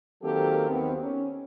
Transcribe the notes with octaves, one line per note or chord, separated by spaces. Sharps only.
D#3 F#3 A#3 C4 G4 A4
D#2 D#3 B3 C4
C#4